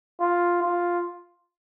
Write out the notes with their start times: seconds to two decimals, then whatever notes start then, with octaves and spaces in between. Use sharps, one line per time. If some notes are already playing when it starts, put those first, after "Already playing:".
0.21 F4
0.63 F4